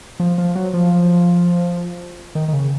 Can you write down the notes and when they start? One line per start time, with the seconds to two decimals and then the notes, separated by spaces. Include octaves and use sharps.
0.20 F3
0.38 F3
0.55 F#3
0.73 F3
2.35 D#3
2.48 D#3
2.53 C#3